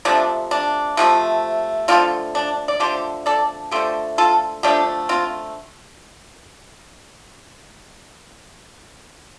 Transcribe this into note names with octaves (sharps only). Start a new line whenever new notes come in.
C3 F3 A3 D4
D4
C3 F3 A3
D3 F3 A3 C4 F4
D4
D5
D3 F3 A3 G4 C5
A4 D5
D3 F3 A3 G4 C5
F4 A4
D3 F3 A3 D4 G4
C4 F4